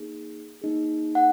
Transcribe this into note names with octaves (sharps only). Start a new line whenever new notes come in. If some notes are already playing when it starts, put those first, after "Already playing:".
Already playing: A#3 D#4 G#4
A#3 D#4 G#4
F#5